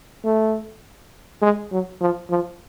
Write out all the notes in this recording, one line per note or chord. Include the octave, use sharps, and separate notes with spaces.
A3
G#3
F#3
F3
F3